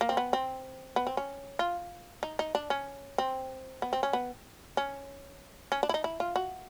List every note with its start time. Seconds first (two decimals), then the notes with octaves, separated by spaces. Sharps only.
0.01 A#3
0.09 C4
0.17 B3
0.33 C4
0.96 B3
1.07 C4
1.17 C#4
1.59 F4
2.23 D#4
2.39 D#4
2.55 D4
2.70 C#4
3.18 C4
3.82 B3
3.93 C4
4.03 C#4
4.13 B3
4.77 C#4
5.72 C#4
5.83 D4
5.89 E4
5.94 D#4
6.04 E4
6.20 F4
6.36 F#4